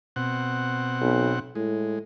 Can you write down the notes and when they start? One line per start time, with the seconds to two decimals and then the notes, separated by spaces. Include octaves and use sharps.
0.16 B2 C4 F#5
1.01 B1
1.55 A2 G#3